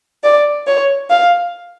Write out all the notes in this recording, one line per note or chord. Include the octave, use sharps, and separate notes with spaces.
D5
C#5
F5